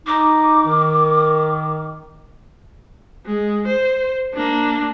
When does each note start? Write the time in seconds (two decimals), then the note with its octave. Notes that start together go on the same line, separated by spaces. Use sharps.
0.07 D#4 D6
0.65 D#3
3.26 G#3
3.66 C5
4.34 A#3 D4